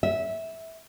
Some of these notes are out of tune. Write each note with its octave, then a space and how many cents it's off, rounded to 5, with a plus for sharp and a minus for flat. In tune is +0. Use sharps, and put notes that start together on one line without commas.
E5 -15